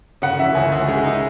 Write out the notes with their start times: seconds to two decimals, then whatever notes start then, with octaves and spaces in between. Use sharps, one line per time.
0.22 C#3 F#5
0.39 E3 E5
0.55 C#2 G#5
0.72 C#2
0.88 G#3
1.04 D#4